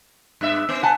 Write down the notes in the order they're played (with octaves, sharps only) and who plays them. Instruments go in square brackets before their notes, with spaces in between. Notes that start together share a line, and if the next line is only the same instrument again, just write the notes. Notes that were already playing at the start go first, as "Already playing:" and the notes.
[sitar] G2 B3 E5
B3
[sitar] B4 [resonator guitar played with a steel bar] F#5 G#5 A5